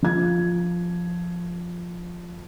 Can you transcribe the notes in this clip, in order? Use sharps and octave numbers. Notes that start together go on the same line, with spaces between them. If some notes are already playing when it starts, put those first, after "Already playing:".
F3 G#6